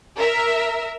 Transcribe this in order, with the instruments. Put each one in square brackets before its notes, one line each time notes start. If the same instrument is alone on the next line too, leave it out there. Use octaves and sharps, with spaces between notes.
[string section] A#4 E5